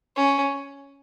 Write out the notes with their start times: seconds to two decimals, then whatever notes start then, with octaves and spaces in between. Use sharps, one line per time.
0.16 C#4